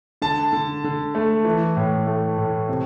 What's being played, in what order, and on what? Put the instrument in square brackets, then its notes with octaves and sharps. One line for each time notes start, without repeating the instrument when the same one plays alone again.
[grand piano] D3 A5
D3
D3
A3
E3
A2
A3
A2
C3